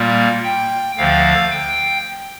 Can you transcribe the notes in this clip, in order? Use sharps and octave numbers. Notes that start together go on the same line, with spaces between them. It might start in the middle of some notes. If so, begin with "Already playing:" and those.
Already playing: A#2 G3 A#3
G5
D2 D3 F3 F5
G5